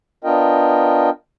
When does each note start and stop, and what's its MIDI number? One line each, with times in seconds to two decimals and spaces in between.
0.24 1.10 59
0.24 1.10 62
0.24 1.10 65
0.24 1.10 70
0.24 1.10 75
0.24 1.10 79